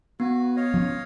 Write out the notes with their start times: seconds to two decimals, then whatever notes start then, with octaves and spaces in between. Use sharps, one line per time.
0.20 B3 F#4 B4
0.56 C#5 D#5 F5
0.74 F3 C#4